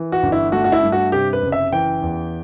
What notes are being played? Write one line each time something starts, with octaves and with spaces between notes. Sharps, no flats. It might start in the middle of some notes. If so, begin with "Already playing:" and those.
Already playing: E3
F#4
G1
E4
A3 F#4
F#4
E4
G2
F#4
C3 G4
B4
F#1
E5
E3 G5
E2